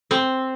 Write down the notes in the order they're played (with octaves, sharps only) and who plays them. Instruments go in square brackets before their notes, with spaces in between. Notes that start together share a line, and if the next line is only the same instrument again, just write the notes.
[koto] C4